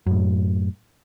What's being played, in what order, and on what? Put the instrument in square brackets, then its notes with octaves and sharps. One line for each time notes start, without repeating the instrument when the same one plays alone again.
[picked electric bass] F#2 A2